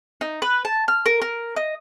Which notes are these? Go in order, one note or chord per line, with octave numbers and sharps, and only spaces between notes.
D#4
B4
A5
F6
A#4
A#4
D#5